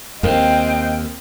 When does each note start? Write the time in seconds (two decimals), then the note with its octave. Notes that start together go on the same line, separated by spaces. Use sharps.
0.23 D#2 C4 A#4 D#5 F5 G5